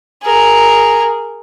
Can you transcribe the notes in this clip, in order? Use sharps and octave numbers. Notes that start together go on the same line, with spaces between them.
G#4 A#4